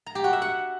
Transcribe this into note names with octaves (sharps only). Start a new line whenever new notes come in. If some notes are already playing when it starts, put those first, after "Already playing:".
A#5
G4
F#4
E5
F#5